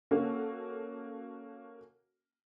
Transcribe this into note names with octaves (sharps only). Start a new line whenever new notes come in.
A#3 C#4 F#4 A4